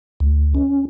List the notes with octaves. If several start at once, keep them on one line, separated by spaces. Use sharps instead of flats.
D2
C#4